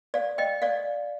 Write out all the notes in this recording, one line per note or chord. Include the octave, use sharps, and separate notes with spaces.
D5 F5
D#5 G5
D5 F5